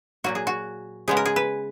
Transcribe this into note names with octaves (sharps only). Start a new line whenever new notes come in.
A#2 F#3 A#3 F#4
G#4
F#4
C#3 G#3 B3 G#4
A#4
G#4
B4